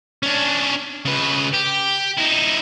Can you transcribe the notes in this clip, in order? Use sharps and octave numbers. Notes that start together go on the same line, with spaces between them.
C#4 D4
C#3 B4
G4
D#4 E4